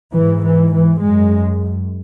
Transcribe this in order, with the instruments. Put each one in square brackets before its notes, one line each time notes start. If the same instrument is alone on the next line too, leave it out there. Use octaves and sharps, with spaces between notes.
[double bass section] G#2 E3
E3
E3
F#2 G#3